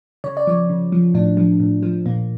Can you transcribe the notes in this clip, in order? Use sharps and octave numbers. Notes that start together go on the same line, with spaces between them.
C#3 C#5
D5
F3 C#5
C#3
F3
A2 D4
F3
A2
F3
A#2 A#3